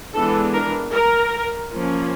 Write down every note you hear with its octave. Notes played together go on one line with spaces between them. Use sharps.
E3 G#3 B3 D4 A4
A#4
A#4
F3 A#3 C#4